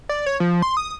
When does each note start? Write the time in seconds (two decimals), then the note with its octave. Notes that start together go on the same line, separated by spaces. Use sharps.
0.09 D5
0.26 C#5
0.40 F3
0.62 C6
0.77 D#6